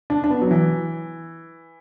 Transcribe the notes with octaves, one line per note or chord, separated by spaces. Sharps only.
D4
D4
B3
F#3
E3